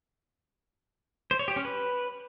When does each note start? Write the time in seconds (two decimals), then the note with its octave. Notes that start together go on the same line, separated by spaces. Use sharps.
1.31 C5
1.39 C#5
1.48 G4
1.56 C#4
1.65 B4